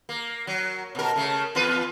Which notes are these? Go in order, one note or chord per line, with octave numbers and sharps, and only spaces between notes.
A#3
F#3
B2 A#4
C#3 A3
E2 F4 B4